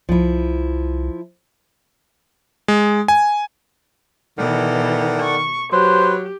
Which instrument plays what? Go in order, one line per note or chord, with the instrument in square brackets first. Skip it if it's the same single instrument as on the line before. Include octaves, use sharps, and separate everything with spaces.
[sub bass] C2 [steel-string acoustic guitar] F3 E4
[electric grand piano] G#3
G#5
[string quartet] B2 E3 [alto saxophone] D#3 [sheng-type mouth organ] A4 D5 F#5
[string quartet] C#6
[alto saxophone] F#3 [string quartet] G4 [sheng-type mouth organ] B4 [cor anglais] C5